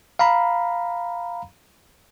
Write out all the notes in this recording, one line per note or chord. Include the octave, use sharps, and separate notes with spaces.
F5 A#5 B5